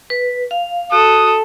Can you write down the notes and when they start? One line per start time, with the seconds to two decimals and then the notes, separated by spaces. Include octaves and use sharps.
0.10 B4
0.51 F5
0.92 F#4 A4 D#6